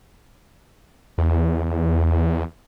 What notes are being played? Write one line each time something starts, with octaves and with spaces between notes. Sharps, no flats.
E2